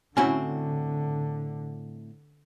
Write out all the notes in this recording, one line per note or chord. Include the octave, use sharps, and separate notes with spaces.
A2 D3 C4 C#4 E4 F#4 G#5